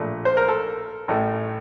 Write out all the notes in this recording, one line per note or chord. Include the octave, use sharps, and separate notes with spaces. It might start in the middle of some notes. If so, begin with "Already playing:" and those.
Already playing: A#1 A#2 A3
C5
A#4
A4
A1 A2 A3